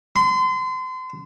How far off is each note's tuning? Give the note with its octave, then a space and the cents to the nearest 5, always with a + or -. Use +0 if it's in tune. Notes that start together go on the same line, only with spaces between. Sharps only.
C6 -35